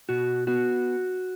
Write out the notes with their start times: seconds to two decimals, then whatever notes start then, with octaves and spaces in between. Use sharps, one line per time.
0.09 B2 F#4
0.47 B3 F#4